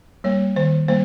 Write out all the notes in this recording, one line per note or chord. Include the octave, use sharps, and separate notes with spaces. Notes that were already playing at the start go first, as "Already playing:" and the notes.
G3 A#3 C#5
D#3 C5
G3 A#3 C5